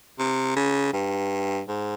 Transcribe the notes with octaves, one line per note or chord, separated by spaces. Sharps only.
C3
C#3
G2
G#2